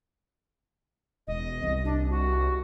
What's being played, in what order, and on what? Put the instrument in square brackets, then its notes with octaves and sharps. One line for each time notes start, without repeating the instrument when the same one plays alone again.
[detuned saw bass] E1 [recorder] D#5
[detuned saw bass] C2
[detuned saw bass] C2 [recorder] D4
[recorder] F#4